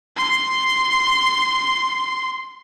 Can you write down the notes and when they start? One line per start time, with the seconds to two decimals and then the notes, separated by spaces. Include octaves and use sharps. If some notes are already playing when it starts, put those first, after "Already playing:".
0.16 C6 C7